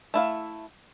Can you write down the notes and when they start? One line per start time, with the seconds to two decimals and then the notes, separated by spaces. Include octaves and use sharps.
0.14 A3 E4 F5